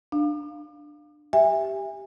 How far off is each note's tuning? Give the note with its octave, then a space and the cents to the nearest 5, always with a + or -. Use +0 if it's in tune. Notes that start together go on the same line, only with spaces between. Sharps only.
D4 +20 F5 +0
G4 +0 E5 +0 G#5 -30